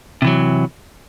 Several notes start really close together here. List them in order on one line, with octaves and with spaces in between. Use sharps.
C3 E3 F#3